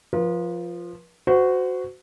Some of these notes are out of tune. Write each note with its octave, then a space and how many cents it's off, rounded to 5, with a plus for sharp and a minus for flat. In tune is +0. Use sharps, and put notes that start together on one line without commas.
F3 +0 B4 -40
F#4 +0 C5 -30